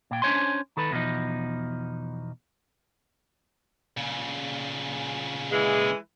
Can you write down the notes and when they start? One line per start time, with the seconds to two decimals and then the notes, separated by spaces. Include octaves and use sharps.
0.11 A#2 G5
0.22 C#4 D4 C5 C#5 G#5 C6
0.77 D#3 A4 B4
0.91 E2 B2 D#3 F3 D#4
3.97 A#2 C#3
5.52 E3 G#3